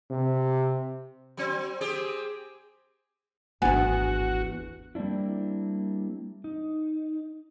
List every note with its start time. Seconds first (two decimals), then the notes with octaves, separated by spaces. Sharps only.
0.10 C3
1.37 F#3 C4
1.81 C4 G4 G#4
3.62 D1 G#1 E2 B3 D4 F#4 G#5
4.95 G3 A#3 C4 D4 E4
6.44 D#4